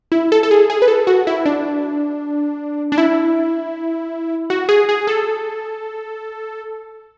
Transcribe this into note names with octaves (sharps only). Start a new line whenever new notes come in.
E4
A4
A4
G#4
G#4
B4
A4
F#4
E4
D4
D4
E4
F#4
G#4
G#4
A4